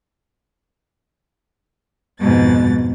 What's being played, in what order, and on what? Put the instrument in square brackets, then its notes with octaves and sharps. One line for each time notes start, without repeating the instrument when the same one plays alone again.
[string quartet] F2 G#2 B2 A6